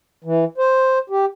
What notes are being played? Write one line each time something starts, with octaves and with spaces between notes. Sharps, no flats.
E3
C5
G4